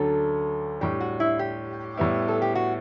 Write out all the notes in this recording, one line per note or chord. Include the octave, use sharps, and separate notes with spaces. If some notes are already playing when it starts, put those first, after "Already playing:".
Already playing: D2 D3 F#3 C#4 A4
A2 G3 D4 G4
F#4
E4
G4
A2 G3 B3 E4
A4
G4
F#4